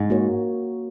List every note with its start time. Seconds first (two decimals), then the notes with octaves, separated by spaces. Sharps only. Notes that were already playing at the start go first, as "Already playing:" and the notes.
Already playing: G#2
0.10 A#3 F#4 A#4 C#5